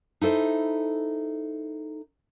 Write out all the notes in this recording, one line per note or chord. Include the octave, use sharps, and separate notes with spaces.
D#4 E4 A4 C5